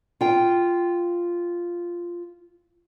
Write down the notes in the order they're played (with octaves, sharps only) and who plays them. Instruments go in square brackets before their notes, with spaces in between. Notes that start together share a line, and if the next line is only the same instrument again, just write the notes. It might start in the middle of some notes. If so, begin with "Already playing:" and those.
[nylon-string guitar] F4 G5